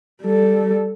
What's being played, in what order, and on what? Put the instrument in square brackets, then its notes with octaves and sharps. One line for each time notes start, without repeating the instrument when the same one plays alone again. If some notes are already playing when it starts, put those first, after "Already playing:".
[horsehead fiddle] G3 A4